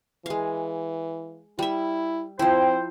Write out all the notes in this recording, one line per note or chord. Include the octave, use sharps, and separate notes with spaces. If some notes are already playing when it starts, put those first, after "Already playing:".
E3 G#3 F5
G3 E4 E5
F3 C4 E4 C5 G5